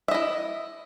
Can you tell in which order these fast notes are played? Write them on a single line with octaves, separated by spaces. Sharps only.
E5 D#5 E4